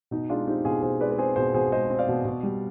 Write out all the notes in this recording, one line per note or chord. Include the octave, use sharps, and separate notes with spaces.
B2 D#4
G#3 D4 F4
C4 D#4 G4
B2 F4 G#4
B2 G#4 C5
G#3 B4 D5
B4
C4 G#4 C5
B2 G#4 C5
B2 G#4 C5
G#3 C5 D#5
C4
D5 F5
B2
B2
G3